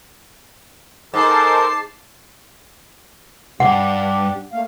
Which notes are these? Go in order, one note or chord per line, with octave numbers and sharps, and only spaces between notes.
G#2 A4 A#4 C5 A5 D6 C7
C#2 G2 D4 G4 F#5
A3 A#3 F5